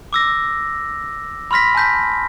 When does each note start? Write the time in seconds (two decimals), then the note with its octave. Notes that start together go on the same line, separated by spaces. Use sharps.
0.13 D6 E6 A#6
1.51 B5 C6 F6 A#6 B6
1.75 G#5 A5 G6 B6